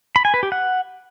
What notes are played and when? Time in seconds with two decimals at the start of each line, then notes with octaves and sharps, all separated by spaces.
0.16 B5
0.25 G#5
0.34 B4
0.43 G4
0.52 F#5